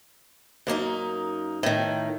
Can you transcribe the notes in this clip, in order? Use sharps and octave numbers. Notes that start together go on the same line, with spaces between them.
F#2 A#3 D4 D#4
A2 D#3